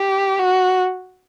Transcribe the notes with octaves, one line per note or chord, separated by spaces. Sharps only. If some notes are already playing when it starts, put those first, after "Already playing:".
Already playing: G4
F#4